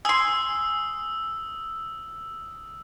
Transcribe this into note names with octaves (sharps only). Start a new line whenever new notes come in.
G#5 C6 D#6 E6